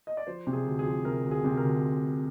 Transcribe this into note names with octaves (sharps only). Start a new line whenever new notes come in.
D#5
D5
F3 C5
C3
G#4
D2
G#4
F3
C3 A#4
D2
G#4
C3
A#4
D2